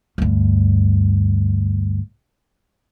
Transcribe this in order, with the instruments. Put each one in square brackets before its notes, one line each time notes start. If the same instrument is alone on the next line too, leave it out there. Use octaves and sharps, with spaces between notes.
[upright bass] D2 G2